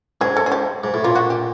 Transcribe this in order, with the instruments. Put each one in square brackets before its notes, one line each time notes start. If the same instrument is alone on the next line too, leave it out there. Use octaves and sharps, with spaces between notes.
[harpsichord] G#2 [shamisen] G#4
[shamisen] A4
G#4
G4
[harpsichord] G#2
A2
[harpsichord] A#2 [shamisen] F4
[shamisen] F#4
G4